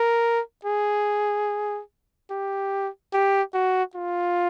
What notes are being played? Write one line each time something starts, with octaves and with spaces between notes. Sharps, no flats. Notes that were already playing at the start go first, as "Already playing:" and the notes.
Already playing: A#4
G#4
G4
G4
F#4
F4